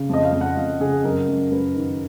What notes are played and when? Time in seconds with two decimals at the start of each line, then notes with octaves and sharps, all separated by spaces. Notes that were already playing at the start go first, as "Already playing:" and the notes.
Already playing: C#3
0.09 F2 D#5
0.25 F5
0.32 F2
0.41 F#5
0.57 F2 F5
0.80 C#3 G#4
1.04 F#2 A#4
1.28 F#2
1.51 F#2 B4
1.76 D#3